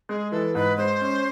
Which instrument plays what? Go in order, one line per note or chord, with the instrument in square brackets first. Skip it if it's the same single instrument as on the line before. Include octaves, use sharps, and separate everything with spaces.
[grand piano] G#3 [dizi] G#4
[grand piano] E3 [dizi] A4
[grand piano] G#2 [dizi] B4
[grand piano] G#3 [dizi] C5
[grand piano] C#4